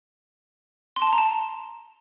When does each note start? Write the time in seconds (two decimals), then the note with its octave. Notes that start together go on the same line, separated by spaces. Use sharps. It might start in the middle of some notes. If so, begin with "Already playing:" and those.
0.96 C6
1.02 A5
1.07 C6
1.13 A#5
1.18 A5